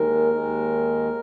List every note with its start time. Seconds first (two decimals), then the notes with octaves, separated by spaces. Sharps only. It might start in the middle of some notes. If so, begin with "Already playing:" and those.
Already playing: D#2 D#3 G#3 A#4
0.32 D#2 D#3 G#3